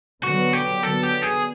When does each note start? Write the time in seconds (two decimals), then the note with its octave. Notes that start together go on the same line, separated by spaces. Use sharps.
0.23 D3 F#3 B3 F#4
0.53 G4
0.83 D3 F#3 B3 A4
1.03 G4
1.23 G#4